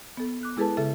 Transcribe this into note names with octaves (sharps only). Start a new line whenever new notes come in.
B3 A4
D6 F#6
G#3 E4 G#4 A4 B4 A5
C#3 A4 E5